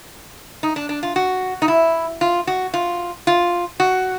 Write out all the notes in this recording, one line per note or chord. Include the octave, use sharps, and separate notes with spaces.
D#4
D4
D4
F4
F#4
D#4
E4
F4
F#4
F4
F4
F#4